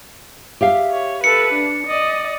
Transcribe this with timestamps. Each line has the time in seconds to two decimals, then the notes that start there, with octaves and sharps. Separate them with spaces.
0.61 G4 E5 F5
0.91 C#5
1.24 A4 B4 C#7
1.53 D4
1.87 D5 D#5